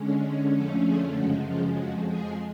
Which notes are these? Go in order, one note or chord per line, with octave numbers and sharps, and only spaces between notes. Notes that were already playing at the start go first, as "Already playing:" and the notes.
Already playing: D3 G#3 C#4
F2 D3 F3 A3 C#4 A4
G#4
F#2 C#3 F3 G#3 F#4
F4
F2 F3 G#3 F#4
G#4